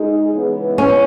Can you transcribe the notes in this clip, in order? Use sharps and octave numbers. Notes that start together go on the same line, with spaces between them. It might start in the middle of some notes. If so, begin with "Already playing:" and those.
Already playing: G#3 D#4 G#4
C#3 E3 G#3 B3 E4
C#4